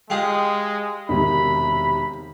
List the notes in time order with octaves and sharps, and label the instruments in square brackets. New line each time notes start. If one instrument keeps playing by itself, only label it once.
[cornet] G#3 [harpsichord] F4 G4 G#4
[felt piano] E1 C3 D#3 [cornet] B5